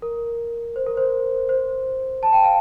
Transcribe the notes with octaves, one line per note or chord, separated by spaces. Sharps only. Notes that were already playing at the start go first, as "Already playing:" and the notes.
A#4
C5
A#4
C5
C5
A5
G5
F5